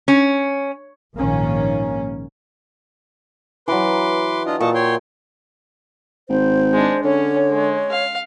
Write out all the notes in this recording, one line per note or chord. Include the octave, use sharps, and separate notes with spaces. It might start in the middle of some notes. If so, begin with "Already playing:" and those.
C#4
A#1 G#2 D#3 A#3 C#4
E3 F#3 B4 C6 D6
D4 F4 D#5
A#2 D#5 A5 C#6
C#5 G5 C6
G#1 C5
G#3 D4
D3 C#4 C#5
G#3
F5